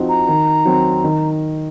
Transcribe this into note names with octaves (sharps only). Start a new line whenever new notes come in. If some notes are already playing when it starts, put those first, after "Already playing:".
Already playing: F3 C4 D#4 F#4
A#5
D#3
F#3 C4
D#3